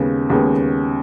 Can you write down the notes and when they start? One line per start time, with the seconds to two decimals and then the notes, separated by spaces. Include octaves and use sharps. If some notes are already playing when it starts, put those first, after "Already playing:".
Already playing: D#2 C#3 G#3 B3
0.30 D#2 C#3 G#3 B3